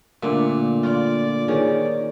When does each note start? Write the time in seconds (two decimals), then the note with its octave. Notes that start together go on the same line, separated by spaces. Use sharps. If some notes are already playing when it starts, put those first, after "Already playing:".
0.23 A#2 D3 A3
0.83 F4 D5
1.48 D#3 C#4 G#4